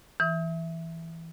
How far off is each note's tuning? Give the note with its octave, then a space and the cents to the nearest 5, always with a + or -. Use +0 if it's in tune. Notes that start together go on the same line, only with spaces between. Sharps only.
E3 +0 E5 +0 D#6 +45